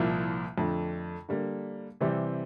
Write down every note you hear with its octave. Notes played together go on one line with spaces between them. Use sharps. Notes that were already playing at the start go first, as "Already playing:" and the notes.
Already playing: C2 A#2 F3 A#3 E4
F2 D3 A3
D3 G3 A#3
C3 E3 G3 C4 G4